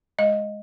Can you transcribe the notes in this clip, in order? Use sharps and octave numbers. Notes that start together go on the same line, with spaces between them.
G#3 D#5